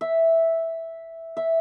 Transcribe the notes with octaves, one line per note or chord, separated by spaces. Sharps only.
E5
E5